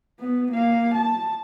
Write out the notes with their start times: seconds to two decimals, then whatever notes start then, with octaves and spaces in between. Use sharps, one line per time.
0.20 B3
0.51 A#3 F5
0.95 A5